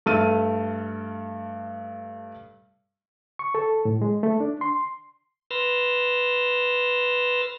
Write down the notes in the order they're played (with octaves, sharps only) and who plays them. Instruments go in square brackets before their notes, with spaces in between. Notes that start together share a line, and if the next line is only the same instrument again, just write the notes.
[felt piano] G2 A3 A4 F6 D#7
[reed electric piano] C#6
A4
A2
G#3
A3
D4
C6
[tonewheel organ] B4 C6 E6 F6 A6 A#6